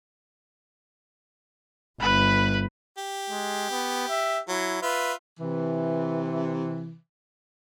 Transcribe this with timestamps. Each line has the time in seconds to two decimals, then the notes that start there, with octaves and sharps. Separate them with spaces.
2.00 G1 B4 B5
2.98 G4
3.30 G#3
3.71 B3
4.09 E5
4.49 F#3 E4
4.82 F4 B4 E5
5.40 C3 E3